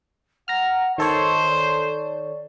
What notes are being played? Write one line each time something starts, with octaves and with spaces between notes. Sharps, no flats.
F#5 A#5 F6
D#3 A4 C5 C#5 D#5
D5